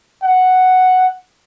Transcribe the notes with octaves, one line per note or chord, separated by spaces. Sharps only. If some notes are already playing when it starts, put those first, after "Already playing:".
F#5